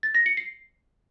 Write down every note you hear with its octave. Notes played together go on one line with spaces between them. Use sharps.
A6
A#6
C#7
C7